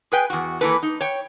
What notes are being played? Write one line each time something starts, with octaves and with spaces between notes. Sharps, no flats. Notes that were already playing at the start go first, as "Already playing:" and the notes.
G#4 B4 G5 G#5
E2 F#4
E3 A#3 C4 E4 A4 B4
D#4
C#5 G5